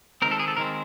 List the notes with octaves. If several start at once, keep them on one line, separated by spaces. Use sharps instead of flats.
D#3 G#3 C4 A#4
A4
G#4
A4
D#3 G#3 C4 A#4